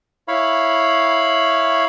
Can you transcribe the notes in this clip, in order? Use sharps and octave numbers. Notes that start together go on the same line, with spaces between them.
E4 C#5 F5 B5